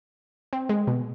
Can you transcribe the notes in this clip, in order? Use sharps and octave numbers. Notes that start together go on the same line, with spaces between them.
C4
G#3
B2